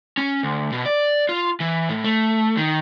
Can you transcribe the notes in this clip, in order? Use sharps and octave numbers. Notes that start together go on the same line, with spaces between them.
C#4
D2
B2
D5
F4
E3
A2
A3
D#3